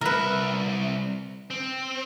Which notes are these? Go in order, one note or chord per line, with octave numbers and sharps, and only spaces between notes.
C2 A#4 B4 E5
C4